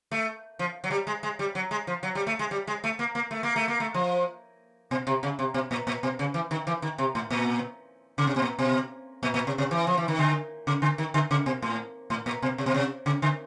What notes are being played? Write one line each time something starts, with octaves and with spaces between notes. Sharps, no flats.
A3
F3
F#3
G3
G#3
G#3
G3
F#3
G#3
F3
F#3
G3
A3
G#3
G3
G#3
A3
A#3
A#3
A3
A#3
A3
A#3
A3
F3
B2
C3
C#3
C3
B2
A#2
A#2
B2
C#3
E3
D#3
E3
D#3
C3
A2
A#2
C#3
C3
B2
A#2
B2
A#2
A#2
C3
C3
E3
F3
E3
D#3
D3
C#3
D3
D#3
D3
C#3
B2
A2
A2
A#2
B2
C3
B2
C3
C#3
D3